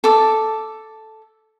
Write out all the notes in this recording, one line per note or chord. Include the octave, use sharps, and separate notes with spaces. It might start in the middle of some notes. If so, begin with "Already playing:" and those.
A4 D6